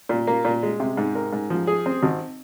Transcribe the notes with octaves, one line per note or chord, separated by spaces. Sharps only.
A#2
A#3
A#2
G#3
C3
G#2
A#4
G#2
F3
G#4
C4
G#1